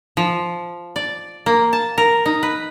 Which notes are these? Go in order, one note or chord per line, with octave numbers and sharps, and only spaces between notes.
F3
D5
A#3
A5
A#4
D#4
B4